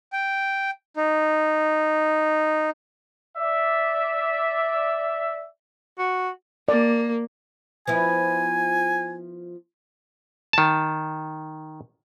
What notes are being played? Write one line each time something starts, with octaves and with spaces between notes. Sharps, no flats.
G5
D#4
D5 E5
F#4
A#3 D5
F3 B3 E4 G#5
D#3 A5